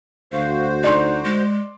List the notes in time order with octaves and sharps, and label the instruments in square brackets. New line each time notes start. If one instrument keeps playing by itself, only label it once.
[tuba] D2 [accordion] F#4 C5 [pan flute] F5
[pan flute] D#4 [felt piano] D5 C6
[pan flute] G#3